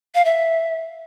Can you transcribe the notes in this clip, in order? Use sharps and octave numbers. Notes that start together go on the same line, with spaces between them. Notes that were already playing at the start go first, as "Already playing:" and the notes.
F5
E5